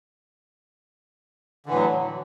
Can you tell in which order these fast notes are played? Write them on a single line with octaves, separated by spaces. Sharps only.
D3 E3 A2 F#3